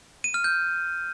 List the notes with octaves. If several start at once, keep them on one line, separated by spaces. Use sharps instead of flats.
D#7
F6
G6